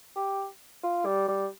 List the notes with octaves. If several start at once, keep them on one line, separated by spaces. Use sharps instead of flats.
G4
F4
G3
G3